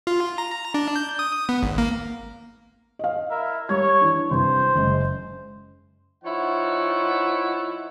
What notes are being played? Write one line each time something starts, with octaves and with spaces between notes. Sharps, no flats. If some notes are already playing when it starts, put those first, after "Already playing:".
F4
A#5
D4
G6
D#6
B3
G#1
A#3
D#5 F5
E4 A#4 E5
G3 C#5 G#6
E3 D4
G2 C3 C5
F#1 G#3
F3 D#4 E4 C#5 F#5